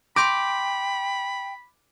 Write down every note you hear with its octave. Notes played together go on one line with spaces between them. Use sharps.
G5 B5 C6 D6 G6 A#6